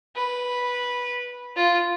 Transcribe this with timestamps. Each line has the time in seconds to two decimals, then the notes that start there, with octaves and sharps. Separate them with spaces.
0.16 B4
1.56 F4